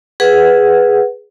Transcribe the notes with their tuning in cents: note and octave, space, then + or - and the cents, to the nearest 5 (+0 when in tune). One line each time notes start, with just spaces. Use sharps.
G#4 +0 B4 +0 F#5 +0